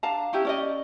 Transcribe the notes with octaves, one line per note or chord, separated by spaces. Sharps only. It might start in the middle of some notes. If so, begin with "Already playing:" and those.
D4 F5 A5 A#5
C#4 E4 G4
C#4 D5 D#5